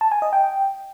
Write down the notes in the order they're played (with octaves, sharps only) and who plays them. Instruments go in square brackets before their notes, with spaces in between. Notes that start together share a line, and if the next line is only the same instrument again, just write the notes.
[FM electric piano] A5
G#5
D#5
G5